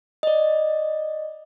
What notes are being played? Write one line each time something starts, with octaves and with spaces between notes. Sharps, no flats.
D5 D#5